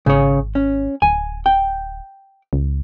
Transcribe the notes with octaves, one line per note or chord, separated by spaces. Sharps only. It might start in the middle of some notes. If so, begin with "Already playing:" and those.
G#1 C#3 C#5
C#4
D1 G#5
G5
C#2